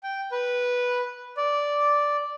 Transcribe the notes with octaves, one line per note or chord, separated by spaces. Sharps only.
G5
B4
D5